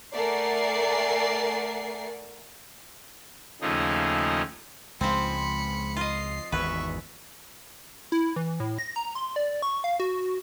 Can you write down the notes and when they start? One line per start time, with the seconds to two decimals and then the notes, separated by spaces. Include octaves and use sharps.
0.14 A3 A#4 D5 F#5 G#5 C7
3.61 D#2 C#3 F3 A3 D#4 G#4
5.01 C#2 F3 G#3 C4 B5 C#7
5.97 F4 D#5 C7
6.52 G#1 E2 G#2 B4 E5 C#6
8.12 E4
8.36 E3
8.60 A2
8.78 A#6
8.96 A#5
9.15 C6
9.36 D5
9.62 C#6
9.84 F5
10.00 F#4